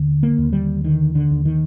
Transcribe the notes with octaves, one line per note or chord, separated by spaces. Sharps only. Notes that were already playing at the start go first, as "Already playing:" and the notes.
Already playing: D#2 D3
A#3
D#2
G3
D3 D#3
D3
D#2
D#3